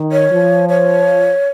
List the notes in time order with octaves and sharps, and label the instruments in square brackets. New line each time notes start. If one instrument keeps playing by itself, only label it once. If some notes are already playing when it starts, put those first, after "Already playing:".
Already playing: [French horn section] D#3
[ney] C#5
[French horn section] F3
[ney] C#5